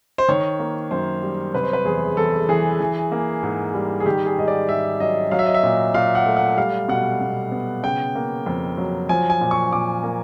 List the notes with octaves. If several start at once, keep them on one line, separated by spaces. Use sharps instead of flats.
C5
D#3 C#5
A#3
F#2 C5
G3
C3 B4
C5
B4
E2 G#4
E2 A4
E3 G#4
E3
A#3
G#2
G3
G#4
D#3 G4
G#4
G#2 D#5
D5
G#2 E5
F#3 D#5
F#3 F5
E5
D#5
E5
A#2
A#2 F5
F#5
A3
F#5
G3 F5
B2 F#5
B2
B3
C#3 G5
A#3
F2
F#3
F3 G#5
G#5
A#2
C#6
A#2 D6
A#3